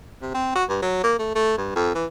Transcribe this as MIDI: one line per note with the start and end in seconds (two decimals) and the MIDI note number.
0.22 0.31 48
0.34 0.54 60
0.55 0.64 66
0.69 0.80 43
0.82 1.00 54
1.03 1.15 58
1.19 1.32 57
1.35 1.57 57
1.58 1.71 43
1.75 1.92 41
1.95 2.05 52